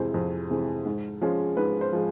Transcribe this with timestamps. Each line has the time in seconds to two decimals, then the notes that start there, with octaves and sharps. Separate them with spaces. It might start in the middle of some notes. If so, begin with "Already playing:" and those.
Already playing: F2 C3 E3 G#3 C5
0.14 F2
0.50 C3 E3 G#3
0.85 G#2
1.21 F3 G#3 C#4
1.57 G#2 B4
1.81 C5
1.93 F3 G#3